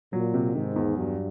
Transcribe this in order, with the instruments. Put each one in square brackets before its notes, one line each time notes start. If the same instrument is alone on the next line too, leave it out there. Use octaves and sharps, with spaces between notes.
[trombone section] A#2 [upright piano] F#3
[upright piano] C3
[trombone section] G#2 [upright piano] D#3
[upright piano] E2
[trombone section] G2 [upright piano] F#3